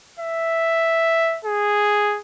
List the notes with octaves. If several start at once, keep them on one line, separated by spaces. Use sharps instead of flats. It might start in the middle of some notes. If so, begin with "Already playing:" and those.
E5
G#4